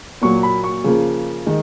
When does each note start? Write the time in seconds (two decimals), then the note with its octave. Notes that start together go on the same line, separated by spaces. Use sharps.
0.22 A#2 F#3 A#3 C#6
0.43 B5
0.64 C#6
0.84 C#3 F3 A#3
1.46 D#3 G#3